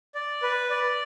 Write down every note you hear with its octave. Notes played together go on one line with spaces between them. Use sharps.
D5
B4
D5